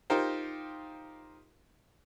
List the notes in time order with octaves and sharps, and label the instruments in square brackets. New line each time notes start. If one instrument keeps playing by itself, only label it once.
[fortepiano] D#4 F4 G4 A#4 C5